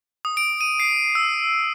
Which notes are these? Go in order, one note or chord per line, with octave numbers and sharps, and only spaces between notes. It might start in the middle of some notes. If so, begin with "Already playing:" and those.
D#6
D7
D#7
C7
E6